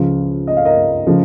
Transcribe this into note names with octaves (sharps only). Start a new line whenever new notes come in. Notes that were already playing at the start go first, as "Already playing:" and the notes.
Already playing: C#2 C#3 F3 F4
D#5
F5
A#4 D#5
C#3 F3